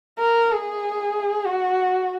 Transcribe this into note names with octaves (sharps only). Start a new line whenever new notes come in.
A#4
G#4
F#4